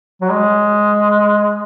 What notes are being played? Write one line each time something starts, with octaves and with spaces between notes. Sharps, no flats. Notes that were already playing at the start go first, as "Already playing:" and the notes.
F#3
G#3